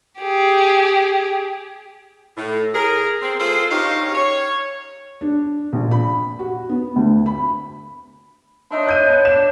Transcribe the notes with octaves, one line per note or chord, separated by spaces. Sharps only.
G4 G#4
A2
G#4 A#4
C4
F4 G#4 A4 C5
G2 C#4 D#4 G4 C#5 F5
C#5
D4
A#1
B5
F#4
B3
D2
B5
D4 D#4 C#5 D#5 E5 C6
F#6 G6 D#7
B3
D4 E7